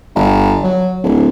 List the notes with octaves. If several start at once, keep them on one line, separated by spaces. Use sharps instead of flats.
G1
F#3
D1